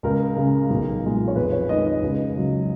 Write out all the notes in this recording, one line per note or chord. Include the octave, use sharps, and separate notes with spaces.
C#2 A#4
C#3 G#3
B1
A#2 G#3
C#5
F2 B4
C#5
D#3 G#3 D#5
D#5
C#2
C#3 F#3